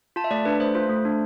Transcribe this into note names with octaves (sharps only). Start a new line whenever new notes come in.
F4 A5
E5
A3 D5
D4 B4
A3 C5
F4 C5
A3
D4